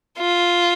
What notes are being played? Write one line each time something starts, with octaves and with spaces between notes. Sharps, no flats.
F4